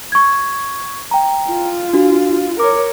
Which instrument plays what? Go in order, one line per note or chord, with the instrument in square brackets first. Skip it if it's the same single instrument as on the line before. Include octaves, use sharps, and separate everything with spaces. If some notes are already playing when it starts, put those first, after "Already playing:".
[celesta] C#6 G#6
G5 A#5
[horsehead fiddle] F4
[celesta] D4 F#4
[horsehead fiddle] A#4 C#5 [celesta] D6